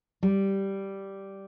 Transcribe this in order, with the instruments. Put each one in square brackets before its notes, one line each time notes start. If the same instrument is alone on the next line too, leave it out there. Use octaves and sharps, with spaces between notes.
[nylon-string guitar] G3